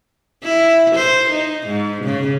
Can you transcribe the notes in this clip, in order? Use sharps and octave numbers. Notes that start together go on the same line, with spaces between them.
E4
C5
D#4
G#2
C#3